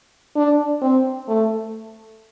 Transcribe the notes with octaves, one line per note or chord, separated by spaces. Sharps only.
D4
C4
A3